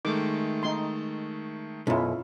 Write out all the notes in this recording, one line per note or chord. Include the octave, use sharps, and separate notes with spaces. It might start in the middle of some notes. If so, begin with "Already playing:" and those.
D#3 G#3 A3 D6
D#4 C6
B1 F#2 C#4 E4 F4